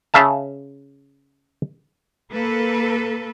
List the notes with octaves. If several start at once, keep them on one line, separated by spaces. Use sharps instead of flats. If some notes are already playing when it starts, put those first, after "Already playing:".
C#3 E5 F5 A5
A#3 A4 B4